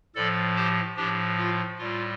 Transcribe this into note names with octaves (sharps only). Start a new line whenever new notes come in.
A2 F3 A4 D5
G4 C5
A2 F3 D4 G4
F4
A2 G3 F4